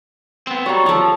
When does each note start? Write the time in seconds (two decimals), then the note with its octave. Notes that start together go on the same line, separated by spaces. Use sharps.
0.47 B3 C4
0.66 F#3 G3 C#5 A#5
0.86 F3 A4 C#6